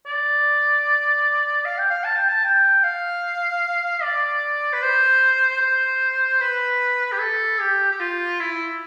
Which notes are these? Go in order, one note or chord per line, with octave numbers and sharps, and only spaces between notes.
D5
F5
G5
F5
A5
G5
A5
G5
F5
D5
B4
C5
C5
B4
G4
A4
G4
G4
F4
E4